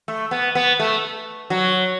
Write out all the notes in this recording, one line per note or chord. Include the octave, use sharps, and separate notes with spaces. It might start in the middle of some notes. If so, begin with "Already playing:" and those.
A3
B3
B3
A3
F#3